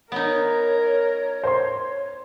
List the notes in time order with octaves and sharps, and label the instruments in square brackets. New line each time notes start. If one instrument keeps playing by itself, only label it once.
[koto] B3 D#4 [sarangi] A#4 [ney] C#5
[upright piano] C5 C6 [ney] C#5